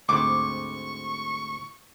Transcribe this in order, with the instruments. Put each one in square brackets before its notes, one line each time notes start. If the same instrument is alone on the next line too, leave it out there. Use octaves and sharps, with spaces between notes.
[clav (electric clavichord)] D2 G#2 C4 [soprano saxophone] C#6 [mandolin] D6